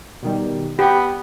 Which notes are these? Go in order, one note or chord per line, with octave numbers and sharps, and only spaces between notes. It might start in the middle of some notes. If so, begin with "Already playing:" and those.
B2 D#3 G3
B3 G4 G5